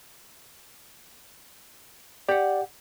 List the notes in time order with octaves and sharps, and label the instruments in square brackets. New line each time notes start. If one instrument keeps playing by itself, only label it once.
[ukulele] G4 F#5 [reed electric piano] D5